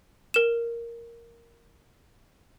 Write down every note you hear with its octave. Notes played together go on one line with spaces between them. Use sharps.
A#4 E7